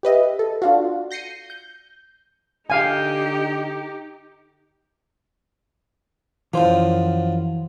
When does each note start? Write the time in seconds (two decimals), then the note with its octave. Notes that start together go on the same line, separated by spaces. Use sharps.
0.03 G4 B4 D#5 E5
0.39 A4
0.62 D4 F4 F#4
1.11 G6 A#6 C7 C#7 D#7
1.50 G6
2.70 D3 D#4 G4 F5 G#5
6.54 F#2 E3 F3 C5